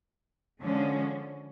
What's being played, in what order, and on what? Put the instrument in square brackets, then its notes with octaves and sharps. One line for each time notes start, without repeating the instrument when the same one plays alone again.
[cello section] D3 F3 G#3 C#4